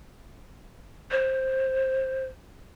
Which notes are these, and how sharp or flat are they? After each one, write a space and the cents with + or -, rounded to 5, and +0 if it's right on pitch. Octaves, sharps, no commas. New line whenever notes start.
C5 +10